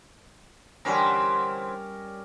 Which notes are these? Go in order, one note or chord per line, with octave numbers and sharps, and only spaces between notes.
D3 E3 G3 C4 C#4 A#4